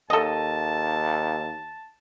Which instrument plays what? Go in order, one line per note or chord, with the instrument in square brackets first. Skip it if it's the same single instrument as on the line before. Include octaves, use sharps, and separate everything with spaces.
[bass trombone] D#2 [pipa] A4 D#5 [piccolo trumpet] A5